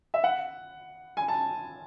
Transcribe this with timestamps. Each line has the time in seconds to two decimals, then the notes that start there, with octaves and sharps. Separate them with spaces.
0.14 E5
0.24 F#5
1.17 G#5
1.28 A5